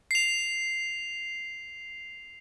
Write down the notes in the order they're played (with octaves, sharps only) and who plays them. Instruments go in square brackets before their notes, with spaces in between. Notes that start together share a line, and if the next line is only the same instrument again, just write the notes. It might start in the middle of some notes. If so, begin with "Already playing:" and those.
[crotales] C7 F7